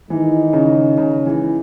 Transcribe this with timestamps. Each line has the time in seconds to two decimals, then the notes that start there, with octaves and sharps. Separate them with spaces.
0.10 D#3 E3 G#3 D#4
0.53 C#3
0.98 C#3
1.26 E3